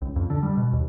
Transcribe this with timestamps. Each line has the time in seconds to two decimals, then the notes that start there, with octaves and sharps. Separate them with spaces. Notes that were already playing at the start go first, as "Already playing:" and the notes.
0.02 C#2
0.16 F2
0.30 D3
0.43 G3
0.57 B2
0.73 D#2